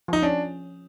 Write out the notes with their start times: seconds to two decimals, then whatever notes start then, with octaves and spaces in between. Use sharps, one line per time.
0.08 F3 D#4
0.22 C#4 D4